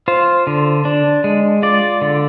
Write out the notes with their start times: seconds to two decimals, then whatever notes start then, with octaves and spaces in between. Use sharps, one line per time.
0.08 F4 C5
0.47 D3
0.85 D4
1.24 G#3
1.62 F4 D5
2.01 D3